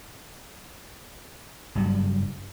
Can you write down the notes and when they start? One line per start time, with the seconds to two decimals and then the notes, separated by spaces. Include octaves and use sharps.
1.75 F#1 G2 F#3